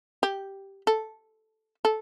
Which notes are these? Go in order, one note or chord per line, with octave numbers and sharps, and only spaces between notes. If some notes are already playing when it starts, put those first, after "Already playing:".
G4
A4
A4